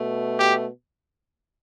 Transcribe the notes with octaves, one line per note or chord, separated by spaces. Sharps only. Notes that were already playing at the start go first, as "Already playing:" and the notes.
Already playing: B2 A3
G4